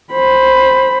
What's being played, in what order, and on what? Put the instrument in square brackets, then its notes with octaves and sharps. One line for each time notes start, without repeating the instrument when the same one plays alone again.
[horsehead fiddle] C5 B5